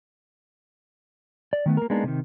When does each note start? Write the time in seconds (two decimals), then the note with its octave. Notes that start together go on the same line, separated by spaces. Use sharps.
1.53 D5
1.66 D#3 A3 B3
1.77 A#3 A#4
1.90 G#3 A#3 B3 D4 D#4
2.04 C3 D#3